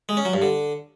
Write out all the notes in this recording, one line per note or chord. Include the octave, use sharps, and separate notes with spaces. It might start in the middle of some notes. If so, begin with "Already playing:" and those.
G#3
C#4
F#3
G2
D3